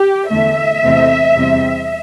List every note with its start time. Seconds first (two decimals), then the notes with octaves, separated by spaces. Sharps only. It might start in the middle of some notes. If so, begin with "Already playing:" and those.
Already playing: G4
0.29 E2 D3 A3 E5
0.83 E2 C3 A3 C4
1.36 E2 C3 G3 C4